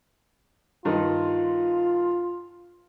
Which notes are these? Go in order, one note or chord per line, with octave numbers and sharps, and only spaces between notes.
G2 D#3 F4